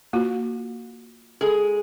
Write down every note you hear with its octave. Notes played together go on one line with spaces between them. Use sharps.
A#3 F4 F#4
G#3 G#4 A4